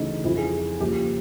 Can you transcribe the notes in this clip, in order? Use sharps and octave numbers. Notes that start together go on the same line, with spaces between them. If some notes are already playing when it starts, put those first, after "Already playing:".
Already playing: D2 C#3 E3 D#4
F2 C3 F3 E4
G#4
D#2 C#3 F3 G4